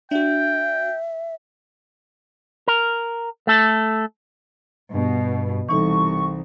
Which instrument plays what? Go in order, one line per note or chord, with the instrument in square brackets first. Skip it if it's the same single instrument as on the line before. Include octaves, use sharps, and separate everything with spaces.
[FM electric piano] D4 F#4 [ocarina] E5 [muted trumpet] G5
[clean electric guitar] A#4
A3 A4
[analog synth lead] G2 [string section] B2
[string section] C2 [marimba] E3 D#4 A4 [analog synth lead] C#6